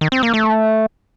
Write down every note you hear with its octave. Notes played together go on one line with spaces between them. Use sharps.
D#3
C4
A#3
A3